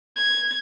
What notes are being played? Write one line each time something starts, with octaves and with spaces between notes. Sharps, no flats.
G#6